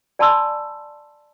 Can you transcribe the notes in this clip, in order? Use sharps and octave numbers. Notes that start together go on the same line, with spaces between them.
D5 G#5 A5 B5 C6 E6